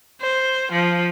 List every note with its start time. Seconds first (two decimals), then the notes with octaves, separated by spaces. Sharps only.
0.21 C5
0.72 F3